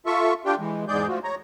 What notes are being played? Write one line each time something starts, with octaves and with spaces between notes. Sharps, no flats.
F4 A4 E5 C#6
D4 F4 G4 G5
E3 G#3
E2 G#2 G#3 G#4 D5 G6
F3 A3 F4 F#4
C#5 A#5